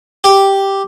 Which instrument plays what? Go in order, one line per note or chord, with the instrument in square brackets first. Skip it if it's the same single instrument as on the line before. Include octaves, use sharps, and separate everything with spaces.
[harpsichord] G4